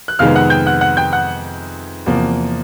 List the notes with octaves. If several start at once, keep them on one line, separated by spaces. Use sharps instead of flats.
F#6
F2 C3 D#3 G#3 B3 F5 F6
F#5 F#6
G5 G6
F#5 F#6
F#5 F#6
G5 G6
F#5 F#6
E2 C3 F3 A#3